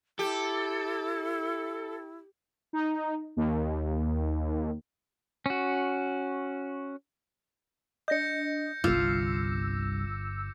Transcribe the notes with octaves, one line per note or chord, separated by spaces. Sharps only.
E4 G4 A4
D#4
D#2
C#4 F#4
D4 D#5 G6 A#6 C#7
G1 C2 G2 F4 D6 E6